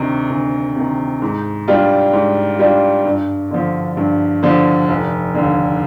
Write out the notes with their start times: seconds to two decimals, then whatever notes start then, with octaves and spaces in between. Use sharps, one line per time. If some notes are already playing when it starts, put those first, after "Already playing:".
Already playing: D2 C3 D#3
0.30 D2
0.76 C3 D#3
1.22 G#2
1.68 G3 D4 F4
2.13 G#2
2.59 G3 D4 F4
3.05 G2
3.51 D3 F3
3.97 G2
4.43 D3 F3
4.88 F1
5.34 D#2 D3